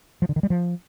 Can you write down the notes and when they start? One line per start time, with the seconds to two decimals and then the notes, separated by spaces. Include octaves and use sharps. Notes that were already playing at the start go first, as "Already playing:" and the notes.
0.22 F3
0.29 D3
0.36 D#3
0.43 G3
0.50 F3